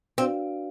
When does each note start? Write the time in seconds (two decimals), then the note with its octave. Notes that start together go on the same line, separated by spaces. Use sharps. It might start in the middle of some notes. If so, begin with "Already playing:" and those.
0.18 C4 D4 F#4 B4 D5 F5